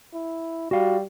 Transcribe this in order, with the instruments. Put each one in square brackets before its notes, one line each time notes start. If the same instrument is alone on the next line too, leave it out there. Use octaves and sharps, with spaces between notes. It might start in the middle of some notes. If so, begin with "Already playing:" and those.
[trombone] E4
[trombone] G3 [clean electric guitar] F#4 F5